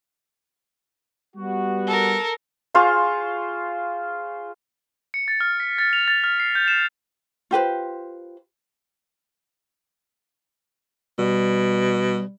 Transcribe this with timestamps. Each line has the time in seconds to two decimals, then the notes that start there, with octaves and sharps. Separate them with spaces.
1.36 G3 B3 F#4
1.87 A4 A#4
2.75 F4 G#4 C5 C#6
5.14 C#7
5.28 A6
5.41 F6
5.60 B6
5.78 A6
5.93 F7
6.08 A6
6.24 F6
6.40 C7
6.55 G6
6.68 E7
7.51 F4 G4 B4 C5
11.19 B2 G3